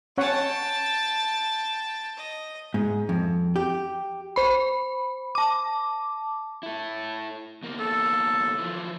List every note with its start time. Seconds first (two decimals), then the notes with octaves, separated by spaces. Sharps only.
0.18 C#4 C#5 F#5 G5 A5
2.17 D#5
2.74 G#2
3.09 F2
3.56 G4
4.36 C5 B5
5.35 A5 D6
6.63 E4 A4
7.63 E2 A#3
7.80 A4
8.58 E3 F3